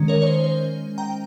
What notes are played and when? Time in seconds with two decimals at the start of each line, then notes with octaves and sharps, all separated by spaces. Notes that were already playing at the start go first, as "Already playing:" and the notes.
Already playing: D#3 G#3 C#4
0.08 A#4 C#5
0.22 C#5
0.27 C5
0.44 C5
0.98 G5 A#5